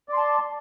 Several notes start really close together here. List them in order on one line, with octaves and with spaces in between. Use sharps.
D5 C6 A5